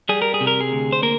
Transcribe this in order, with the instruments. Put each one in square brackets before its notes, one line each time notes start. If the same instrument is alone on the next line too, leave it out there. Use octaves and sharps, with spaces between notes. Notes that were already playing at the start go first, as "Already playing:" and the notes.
[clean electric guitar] G3 G#4
A#4
G#4
C3
A#4
G#4
D2
C5
A#3 A#4